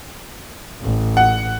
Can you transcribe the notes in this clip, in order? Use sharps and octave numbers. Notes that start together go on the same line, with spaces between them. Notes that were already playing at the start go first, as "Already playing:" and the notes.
A1
F#5